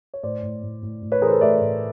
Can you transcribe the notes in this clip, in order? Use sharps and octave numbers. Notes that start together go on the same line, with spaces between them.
C#5
A2 C5 D5
A2
A2
A2
A2
B4 C#5
E3 G#4 A#4
C5
A4 B4
A3 D5 E5
A2